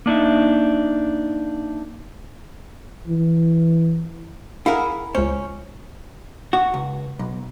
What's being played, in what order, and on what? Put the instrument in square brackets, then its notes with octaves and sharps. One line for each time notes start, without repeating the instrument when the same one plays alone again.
[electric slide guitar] A#3 D4 D#4 E5
[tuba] E3
[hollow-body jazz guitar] E4 G#4 A#4 [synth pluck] F5 F#5
[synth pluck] C#2 C5 [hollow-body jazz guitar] C#4
[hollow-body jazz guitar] F#4
C#2
B1